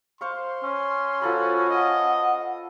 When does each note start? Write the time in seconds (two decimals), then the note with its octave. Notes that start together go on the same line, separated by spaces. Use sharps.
0.21 C5 F5 C6 C#6
0.64 C#4
1.22 F3 F#4 A4 B5
1.69 D#5 F#5